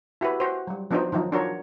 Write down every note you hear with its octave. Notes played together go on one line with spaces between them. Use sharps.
E4 F#4 G4 B4
F#4 C5
F#3 G3
F3 B3 D4 D#4 F#4 C5
D#3 F3 F#3 D#4
D4 F4 F#4 A#4 C#5